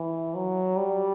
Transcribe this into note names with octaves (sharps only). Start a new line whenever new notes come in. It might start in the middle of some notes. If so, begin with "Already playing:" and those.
Already playing: E3
F#3
G3